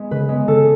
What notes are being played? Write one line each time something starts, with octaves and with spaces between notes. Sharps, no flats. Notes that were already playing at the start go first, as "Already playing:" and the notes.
Already playing: G#3 B3
C#3 B4
G#3 B3
C#3 A4